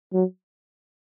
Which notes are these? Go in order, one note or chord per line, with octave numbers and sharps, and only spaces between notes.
F#3